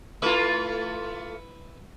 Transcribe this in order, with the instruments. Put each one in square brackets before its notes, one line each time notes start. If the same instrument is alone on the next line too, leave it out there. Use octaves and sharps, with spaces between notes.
[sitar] A3 F4 [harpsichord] E4 B4 E5